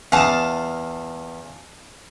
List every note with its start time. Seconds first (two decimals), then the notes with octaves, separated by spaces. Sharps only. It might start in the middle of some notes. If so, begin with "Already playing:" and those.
0.12 E2 F5 A5 D#6